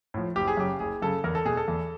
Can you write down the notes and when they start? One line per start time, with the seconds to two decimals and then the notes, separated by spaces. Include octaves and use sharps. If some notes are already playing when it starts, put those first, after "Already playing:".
0.14 A2 F3
0.36 F#1 G4
0.47 G#4
0.57 F#2 C#3 G4
0.80 F#1 G#4
1.02 F#2 C#3 A4
1.24 E2 A#4
1.35 A4
1.45 B2 G#4
1.57 A4
1.68 E2